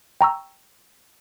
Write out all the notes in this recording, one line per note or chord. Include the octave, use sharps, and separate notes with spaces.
G5 A#5 C#6 E6